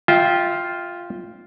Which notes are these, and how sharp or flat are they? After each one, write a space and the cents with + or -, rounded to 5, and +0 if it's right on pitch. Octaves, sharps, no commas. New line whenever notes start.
F4 +0 E5 -30 G5 +0